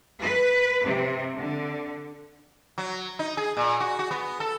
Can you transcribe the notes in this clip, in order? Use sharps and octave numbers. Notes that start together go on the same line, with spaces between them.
B4
C3
D3
F#3
D#4
G#4
A#2
F#4
F#4
B3
A4